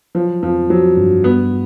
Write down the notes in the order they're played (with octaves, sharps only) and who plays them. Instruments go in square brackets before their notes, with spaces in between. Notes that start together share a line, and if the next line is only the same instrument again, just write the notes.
[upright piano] F3 [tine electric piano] F#3
[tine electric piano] F2 [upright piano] F3
[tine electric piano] F3 [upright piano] F#3
[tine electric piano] G2
[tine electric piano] G3 [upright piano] B3